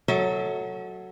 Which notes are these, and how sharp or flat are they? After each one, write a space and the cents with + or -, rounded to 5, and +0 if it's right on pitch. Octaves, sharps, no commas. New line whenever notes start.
F#3 +0 A4 +0 E5 -45